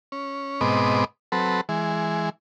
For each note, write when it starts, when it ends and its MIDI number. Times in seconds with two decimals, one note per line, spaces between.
0.12 0.61 61
0.61 1.05 44
0.61 1.05 47
0.61 1.05 59
0.61 1.05 60
0.61 1.05 75
0.61 1.05 86
1.32 1.61 54
1.32 1.61 60
1.32 1.61 69
1.32 1.61 71
1.69 2.29 52
1.69 2.29 56